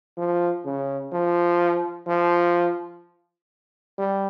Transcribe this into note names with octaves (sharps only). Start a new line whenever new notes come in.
F3
C#3
F3
F3
G3